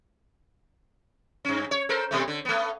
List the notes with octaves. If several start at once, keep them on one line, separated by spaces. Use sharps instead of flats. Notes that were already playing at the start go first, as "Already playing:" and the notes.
G2 C#4
C#5
A4 A#4 C5
B2 G3 A3
D3
A3 B3